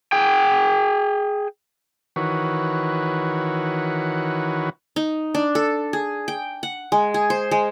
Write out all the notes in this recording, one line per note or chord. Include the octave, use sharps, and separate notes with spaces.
G#4 G5
D#3 E3 F#4 B4 C#5
D#4
D4
A4
G#4
G5
F#5
G#3
G#4
C5
G#3